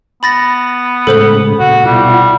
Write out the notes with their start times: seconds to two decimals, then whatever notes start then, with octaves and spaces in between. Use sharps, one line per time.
0.23 B3 B5 A6 A#6
1.07 A2 C#3 G#3 A4 C5 F#7
1.60 A#2 F#4
1.85 B2 G3 E4 F4 F#5